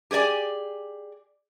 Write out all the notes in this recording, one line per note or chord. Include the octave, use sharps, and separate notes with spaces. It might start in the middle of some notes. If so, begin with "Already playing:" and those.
G4 G#4 C5 D5 G#5